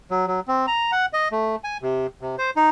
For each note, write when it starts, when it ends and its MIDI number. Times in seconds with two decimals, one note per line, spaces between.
0.11 0.26 54
0.27 0.40 54
0.48 0.66 60
0.67 0.91 82
0.92 1.06 78
1.13 1.28 75
1.31 1.56 57
1.64 1.77 80
1.82 2.07 48
2.21 2.36 48
2.38 2.50 72
2.56 2.70 63